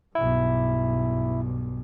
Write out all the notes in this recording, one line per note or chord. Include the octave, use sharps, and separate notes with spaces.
B1 G2 E4